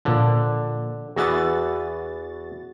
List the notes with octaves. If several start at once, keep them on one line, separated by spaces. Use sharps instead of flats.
A#2 D3 F3
E2 E3 B3 F#4 A6